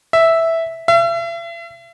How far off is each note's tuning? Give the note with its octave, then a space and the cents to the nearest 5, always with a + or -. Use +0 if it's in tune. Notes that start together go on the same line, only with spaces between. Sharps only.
E5 -5
E5 +40